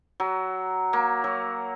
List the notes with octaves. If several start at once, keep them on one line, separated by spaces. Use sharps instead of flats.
F#3
A#3
F#3